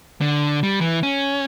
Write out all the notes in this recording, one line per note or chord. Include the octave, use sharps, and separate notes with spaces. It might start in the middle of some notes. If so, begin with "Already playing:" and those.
D3
G3
E3
C#4